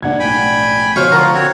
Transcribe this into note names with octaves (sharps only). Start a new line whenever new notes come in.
C#2 G2 A#3 D4 F#5 G#6
B1 A2 G5 G#5 B5
F1 B2 C5 C#5 F5 C#6
D3 F3 F4 A#4 F#5 A#5 C#6
C4 F#4 C#5 F#5